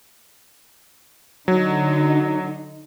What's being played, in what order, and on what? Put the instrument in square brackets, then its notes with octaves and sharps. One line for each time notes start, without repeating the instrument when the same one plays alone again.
[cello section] D3 D#4 [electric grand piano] F#3